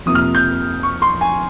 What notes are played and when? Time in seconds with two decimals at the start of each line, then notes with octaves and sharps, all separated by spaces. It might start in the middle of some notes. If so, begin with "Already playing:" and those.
0.06 F2 C3 F3 A#3 D#6
0.15 F6
0.35 G6
0.83 C#6
1.02 C6
1.21 G#5